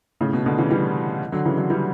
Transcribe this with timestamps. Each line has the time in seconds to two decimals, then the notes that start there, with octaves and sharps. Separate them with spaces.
0.21 A2 C#3
0.33 B2
0.46 B2 D3
0.58 C#3 E3
0.71 E3 G3
1.32 D3 F#3
1.45 C#3 E3
1.57 D3 F#3
1.70 E3 G3